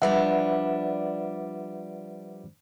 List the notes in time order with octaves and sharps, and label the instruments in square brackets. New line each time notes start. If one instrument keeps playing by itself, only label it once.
[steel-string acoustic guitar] F3 G3 D4 [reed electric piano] B4 E5 F#5